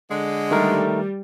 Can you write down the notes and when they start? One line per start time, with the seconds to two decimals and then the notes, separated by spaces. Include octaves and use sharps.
0.11 D3 G#3
0.51 D#3 G3 A3 A#4